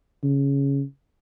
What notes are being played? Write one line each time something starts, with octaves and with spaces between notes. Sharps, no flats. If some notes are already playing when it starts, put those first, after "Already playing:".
C#3